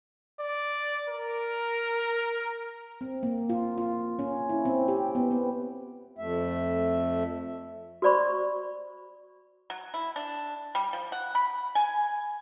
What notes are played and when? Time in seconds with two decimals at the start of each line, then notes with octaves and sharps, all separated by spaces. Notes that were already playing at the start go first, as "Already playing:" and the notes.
0.40 D5
1.09 A#4
3.01 C4
3.23 A#3
3.50 F4
3.78 F4
4.19 C#4
4.49 E4
4.65 C4
4.88 G4
5.15 B3
5.31 B3
6.19 F2 A3 E5
8.02 F#4 C5 D5 B5 C#6
9.70 F#3
9.94 E4
10.16 D4
10.75 G3
10.93 F3
11.12 F#5
11.35 B5
11.75 G#5